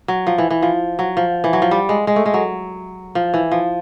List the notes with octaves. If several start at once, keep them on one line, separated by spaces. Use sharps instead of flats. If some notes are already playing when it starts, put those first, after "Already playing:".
F#3
F3
E3
E3
F3
F#3
F3
E3
F#3
F3
G3
G#3
G#3
A3
G#3
F#3
F3
E3
F3